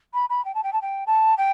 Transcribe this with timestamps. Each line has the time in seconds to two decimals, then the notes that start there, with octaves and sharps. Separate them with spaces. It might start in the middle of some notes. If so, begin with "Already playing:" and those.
0.14 B5
0.29 B5
0.45 G5
0.55 A5
0.63 G5
0.73 A5
0.81 G5
1.07 A5
1.37 G5